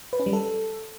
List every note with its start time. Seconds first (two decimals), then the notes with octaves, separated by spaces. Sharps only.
0.13 B4
0.20 C#4
0.26 G3
0.33 A4